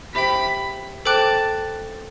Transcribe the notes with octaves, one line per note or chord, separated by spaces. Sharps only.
G4 C5 E5 G5 B5
A4 C5 G5 A5 D6 F#6